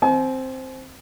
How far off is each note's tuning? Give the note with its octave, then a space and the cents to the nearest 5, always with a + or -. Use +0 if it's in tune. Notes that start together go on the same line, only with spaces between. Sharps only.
C4 +0 G#5 +45